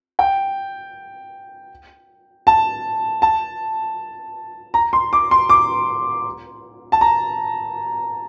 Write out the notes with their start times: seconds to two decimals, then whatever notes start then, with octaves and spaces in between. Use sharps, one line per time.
0.19 G5
2.47 A5
3.22 A5
4.74 A#5
4.93 C6
5.13 D6
5.31 C6
5.49 D6
6.92 A5
7.01 A#5